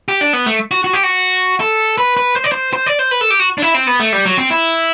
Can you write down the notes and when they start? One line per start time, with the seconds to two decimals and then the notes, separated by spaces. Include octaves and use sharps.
0.08 G4
0.21 D4
0.33 B3
0.46 A3
0.71 F#4
0.84 F#4
0.93 G4
1.03 F#4
1.60 A4
1.98 B4
2.17 B4
2.36 C5
2.44 D5
2.52 C5
2.73 C5
2.86 D5
2.99 C5
3.11 B4
3.21 A4
3.31 G4
3.40 F#4
3.58 D4
3.62 E4
3.74 C4
3.87 B3
4.00 A3
4.13 G3
4.25 F#3
4.38 C4
4.51 E4